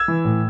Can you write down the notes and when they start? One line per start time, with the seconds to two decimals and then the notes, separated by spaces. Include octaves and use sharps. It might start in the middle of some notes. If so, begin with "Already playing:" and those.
Already playing: E6 G#6
0.08 E3
0.25 A2